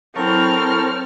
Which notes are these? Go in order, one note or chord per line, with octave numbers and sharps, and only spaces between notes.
F#3 C4 E4 A4 A#4 C#5 B5 F6